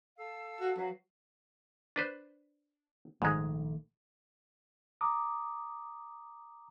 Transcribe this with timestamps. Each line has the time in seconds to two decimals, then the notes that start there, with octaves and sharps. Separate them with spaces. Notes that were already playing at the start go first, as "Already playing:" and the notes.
0.18 A4 F5 E6
0.60 F#4
0.77 F#3 F#4 B4 F5
1.96 D4 B4 C5
3.22 A#1 G#2 D#3 G#3 A3
5.01 A#5 D6 D#6